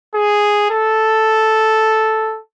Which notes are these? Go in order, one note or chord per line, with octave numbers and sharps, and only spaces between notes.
G#4
A4